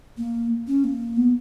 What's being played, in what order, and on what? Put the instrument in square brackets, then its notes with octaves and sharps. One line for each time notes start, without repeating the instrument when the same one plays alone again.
[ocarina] A#3
C#4
A#3
B3